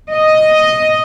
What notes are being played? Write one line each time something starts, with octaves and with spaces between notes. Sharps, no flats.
D#5